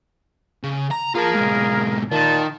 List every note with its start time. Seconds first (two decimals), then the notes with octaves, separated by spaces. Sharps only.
0.64 C#3
0.91 A#5
1.15 A#3 F4 G#4 A#4 A5
1.35 G#2 B2
2.11 A#2 D#3 A5